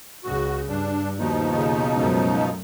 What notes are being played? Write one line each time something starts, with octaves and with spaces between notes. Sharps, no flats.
C#2 C#3 F#4
G2 D4
D#2 B2 F3 D#4
C#3
C#2 F#2 A3